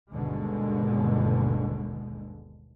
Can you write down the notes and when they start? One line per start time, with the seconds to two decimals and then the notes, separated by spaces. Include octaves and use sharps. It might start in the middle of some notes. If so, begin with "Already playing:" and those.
0.11 G1 D#2 B2 D3 G#3